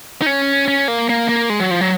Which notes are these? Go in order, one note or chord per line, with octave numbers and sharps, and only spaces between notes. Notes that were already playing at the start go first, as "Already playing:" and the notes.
D#4
C#4
C#4
A#3
A#3
A#3
G#3
F#3
F3
F#3